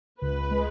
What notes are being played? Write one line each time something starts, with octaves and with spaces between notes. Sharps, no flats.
C#2 B4
G#3